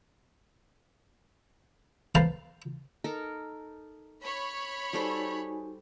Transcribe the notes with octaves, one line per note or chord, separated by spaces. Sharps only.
B4 C5 F5 A5 A#5 C6
D#4 A4 A#4
C#5 B5
G3 D#4 F#4 A4 C5 G#5